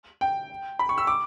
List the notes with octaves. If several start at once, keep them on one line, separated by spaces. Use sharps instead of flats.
G5
B5
C#6
E6
D6